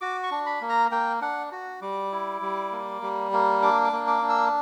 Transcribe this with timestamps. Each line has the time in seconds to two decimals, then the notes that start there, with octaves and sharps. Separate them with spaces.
0.01 F#4 D6
0.24 C#6
0.31 D4
0.46 B5
0.61 A#3
0.69 A#5
0.91 A#3 G5
1.21 D4 F#5
1.52 F#4
1.81 G3 D6
2.12 E4
2.42 G3
2.72 A#3
3.02 G3
3.32 A#3
3.62 D4 D6
3.85 D6
3.92 A#3
4.07 D6
4.22 D4
4.30 E6